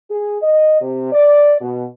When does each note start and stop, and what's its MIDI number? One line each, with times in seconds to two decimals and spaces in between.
0.11 0.41 68
0.42 0.78 75
0.81 1.11 48
1.12 1.56 74
1.61 1.85 47